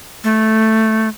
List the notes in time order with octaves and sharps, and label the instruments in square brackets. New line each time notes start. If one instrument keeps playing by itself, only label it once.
[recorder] A3